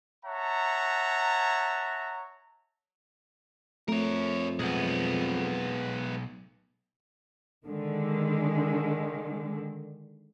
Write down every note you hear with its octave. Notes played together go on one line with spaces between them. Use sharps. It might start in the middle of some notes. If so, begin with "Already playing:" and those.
C#5 E5 F#5 A5 A#5
F2 A3 A#4 C#5
B1 G#3 B3
D3 D#3 G#3